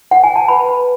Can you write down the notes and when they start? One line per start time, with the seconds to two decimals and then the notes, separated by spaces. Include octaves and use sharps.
0.11 F#5
0.24 G#5
0.36 A5
0.48 B4 B5
0.68 B4